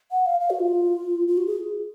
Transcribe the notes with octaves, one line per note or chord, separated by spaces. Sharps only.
F#5
F5
F5
F#4
F4
F4
F#4
G#4